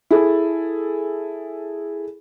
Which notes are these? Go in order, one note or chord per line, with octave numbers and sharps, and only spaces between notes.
E4 G#4 A4